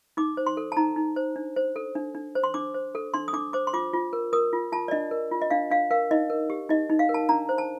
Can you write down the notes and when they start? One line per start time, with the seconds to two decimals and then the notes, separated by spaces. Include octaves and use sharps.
0.17 D#4 D6
0.37 C5
0.46 C6
0.57 A4
0.72 A5
0.77 D#4 A#5
0.96 D#4
1.16 C5
1.36 D4
1.56 C5
1.76 A4
1.95 D4
2.15 D4
2.35 C5
2.44 C6
2.54 D4 D6
2.74 C5
2.95 A4
3.14 D4 C6
3.28 D#6
3.33 D4 D6
3.53 C5 D6
3.67 C6
3.73 F4 D6
3.94 F4
4.13 A#4
4.33 A#4 D#6
4.53 F4
4.72 F4 A5
4.88 D5
4.91 D4 D#5
5.11 A#4
5.31 F4
5.41 D#5
5.50 D4 F5
5.71 D4 F5
5.91 A#4 F5
6.11 D#4 D#5
6.30 A#4
6.50 G4
6.69 D#4 D#5
6.89 D#4
6.99 F5
7.09 A#4
7.14 A5
7.29 D4 A#5
7.49 C5
7.58 A5